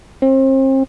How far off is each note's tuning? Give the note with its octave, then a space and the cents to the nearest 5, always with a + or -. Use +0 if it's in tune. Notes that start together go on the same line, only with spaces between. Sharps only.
C4 +35